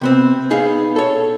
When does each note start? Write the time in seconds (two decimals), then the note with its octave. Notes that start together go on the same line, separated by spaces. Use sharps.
0.01 C3 B3 C4
0.50 B3 D#4 G#4 F5
0.96 A4 C#5